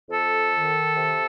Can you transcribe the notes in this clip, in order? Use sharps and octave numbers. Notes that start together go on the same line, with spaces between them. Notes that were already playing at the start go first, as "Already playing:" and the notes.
F2 A4
D#3
C3